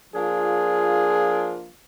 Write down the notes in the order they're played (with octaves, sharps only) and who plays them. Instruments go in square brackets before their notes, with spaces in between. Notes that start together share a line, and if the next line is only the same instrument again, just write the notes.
[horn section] F3 A#3 D4 F4 G#4